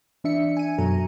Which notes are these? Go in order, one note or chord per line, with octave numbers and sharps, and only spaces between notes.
E3 D4 E5 C#7
G#5 D#7
F#2 B2 F#3 A4 A#5 D#7